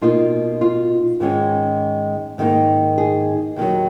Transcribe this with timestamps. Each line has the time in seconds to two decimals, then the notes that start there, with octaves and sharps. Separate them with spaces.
0.01 B2 A#3 D#4 F4
0.61 F4
1.20 G#2 D#3 G#3 C#4
2.38 G#2 D#3 A#3 D#4
2.98 G#4
3.56 D#2 D#3 F#3